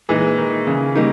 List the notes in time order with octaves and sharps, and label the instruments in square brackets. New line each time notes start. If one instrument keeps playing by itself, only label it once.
[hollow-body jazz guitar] A#2 G#3 D#4 [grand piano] E3
[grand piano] D#3
C#3
[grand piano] D#3 [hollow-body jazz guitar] G3 A#3 D#4